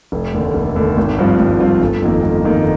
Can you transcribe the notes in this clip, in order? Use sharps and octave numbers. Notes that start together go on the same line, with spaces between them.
F1
D#2 D3
F1
D#2 D3
G#1
G2 F3 C4 F4
G#1
G2 F3 C4 F4
G1
F2 D#3 A#3
G1
F2 D#3 A#3